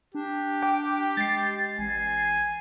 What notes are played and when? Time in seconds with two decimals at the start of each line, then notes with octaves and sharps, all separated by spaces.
0.15 D4 G4
0.62 G5 D6
1.17 G#3 A6 C7
1.79 A1 G#5